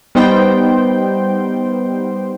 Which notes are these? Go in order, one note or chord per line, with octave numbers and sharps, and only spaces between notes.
G3 B3 D#4 C5 G5